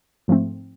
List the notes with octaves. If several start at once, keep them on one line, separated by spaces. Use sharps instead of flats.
G#2 F3 A3 C4